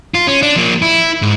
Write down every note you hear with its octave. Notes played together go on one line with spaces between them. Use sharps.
F4
C#4
D4
F3 A#3
E4
G#2